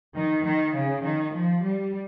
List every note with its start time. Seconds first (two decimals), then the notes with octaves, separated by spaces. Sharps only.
0.18 D#3
0.47 D#3
0.76 C#3
1.05 D#3
1.35 F3
1.65 G3